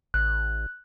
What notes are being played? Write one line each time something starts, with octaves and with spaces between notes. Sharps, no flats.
A1 F#6